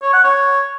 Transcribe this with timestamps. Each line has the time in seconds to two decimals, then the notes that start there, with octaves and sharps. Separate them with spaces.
0.02 C#5
0.13 F#5
0.24 C#5